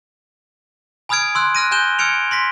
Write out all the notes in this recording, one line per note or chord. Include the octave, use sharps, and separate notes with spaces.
G#5 B5 D#6 F6 G#6 D7
C6 E6 F#6
F6 F#6 A#6 D#7
G#5 F#6 G6 E7 G7
E6 F6 G#6 C#7 D7 F7
C6 A#6 B6